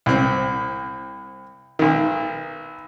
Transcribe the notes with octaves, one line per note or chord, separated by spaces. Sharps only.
C2 C4
B1 D#3